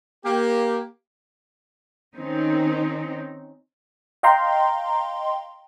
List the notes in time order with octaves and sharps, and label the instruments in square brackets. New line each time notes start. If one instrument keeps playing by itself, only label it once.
[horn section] A#3 G4
[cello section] D#3 C4 C#4 D#4
[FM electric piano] D#5 F5 G5 A#5 C6